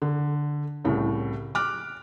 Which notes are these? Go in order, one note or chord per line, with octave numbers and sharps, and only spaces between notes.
D3
C2 A2 C#3
D6 F6 F#6